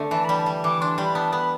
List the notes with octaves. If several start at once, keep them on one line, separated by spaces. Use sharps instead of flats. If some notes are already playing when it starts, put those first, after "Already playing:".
Already playing: D3 A3
E3 A5
G3 B5
A5
G3
E3 D6
D4 C6
G3 B5
B3 A5
B3 B5